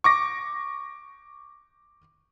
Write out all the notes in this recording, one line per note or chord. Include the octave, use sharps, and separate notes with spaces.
C#6 D6 A#6